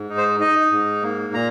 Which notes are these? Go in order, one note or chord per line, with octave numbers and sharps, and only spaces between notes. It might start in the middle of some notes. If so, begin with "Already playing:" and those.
Already playing: G#2
D#4
C5
D#4 D#5
G#2
A#3
A#2 A#5